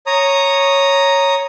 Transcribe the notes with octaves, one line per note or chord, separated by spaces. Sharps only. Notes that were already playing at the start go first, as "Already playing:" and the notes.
C#5 A#5 D#6